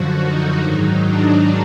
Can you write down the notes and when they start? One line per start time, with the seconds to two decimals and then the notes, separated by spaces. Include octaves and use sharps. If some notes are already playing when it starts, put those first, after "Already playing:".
Already playing: F#2 D3 F3 F#4
0.22 D#4
0.62 G#2 D#3 F#3
1.04 D4